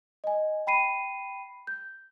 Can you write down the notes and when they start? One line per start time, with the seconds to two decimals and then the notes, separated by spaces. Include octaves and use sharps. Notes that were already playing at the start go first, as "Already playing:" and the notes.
0.24 D#5 G#5
0.67 G5 B5 C7 D#7
1.67 G6